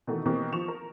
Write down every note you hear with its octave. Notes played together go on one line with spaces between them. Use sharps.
B2 D#3 E3 A3 F#4
B2 E3 A#3 C4 G4
F3 C#6 E7 F7
A#4